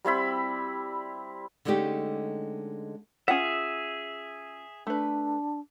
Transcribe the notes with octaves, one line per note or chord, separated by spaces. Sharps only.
G3 C4 E4 B5
D3 G#3 A3 C#4 D#4 G4
C#4 F4 G#4 E5 F#5
A3 D4 B4